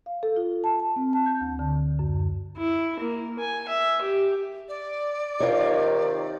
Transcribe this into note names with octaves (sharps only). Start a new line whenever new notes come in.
F5
A4
F4
A5
A5
C4
A5
G6
D2
D3
F#2
E4
A#3
G#5
E5
G4
D5
C3 D#3 F4 C#5